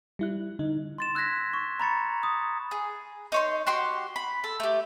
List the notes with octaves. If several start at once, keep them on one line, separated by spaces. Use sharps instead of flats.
G3 E4 F#6
D3 D#4
C6 A6 E7
E6 F#6 G#6 A#6 B6
C#6
A#5 B5 A6 C#7
D#6
G#4
D#4 C#5 C6
F#4 G4 C6 C#6
B5
A4
A3 G4